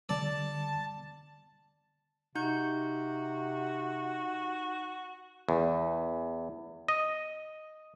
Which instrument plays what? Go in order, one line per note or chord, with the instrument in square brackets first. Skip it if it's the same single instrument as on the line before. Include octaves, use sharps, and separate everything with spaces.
[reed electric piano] D3 G3 [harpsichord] D5 [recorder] A5
[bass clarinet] C3 [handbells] D#4 G6 [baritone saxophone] F#4
[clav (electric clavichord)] E2
D#5